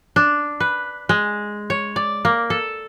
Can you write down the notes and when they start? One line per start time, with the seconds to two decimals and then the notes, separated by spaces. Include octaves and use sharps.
0.16 D4
0.60 B4
1.09 G#3
1.70 C#5
1.96 D5
2.25 A#3
2.50 A4